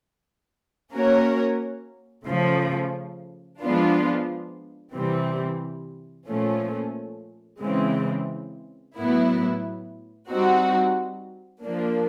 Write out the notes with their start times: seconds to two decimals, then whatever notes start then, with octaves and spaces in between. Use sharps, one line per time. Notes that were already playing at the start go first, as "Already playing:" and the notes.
0.93 A#3 C#4 F#4 A#4 C#5
2.27 C#3 F3 A3
3.61 F3 G#3 B3 D4 F4
4.95 C3 E3 G3 C4
6.28 A#2 F3 A3 C#4
7.62 C#3 E3 G#3 C4
8.96 A2 F#3 B3 E4
10.29 G3 C4 D#4 F#4
11.63 F3 A#3 D4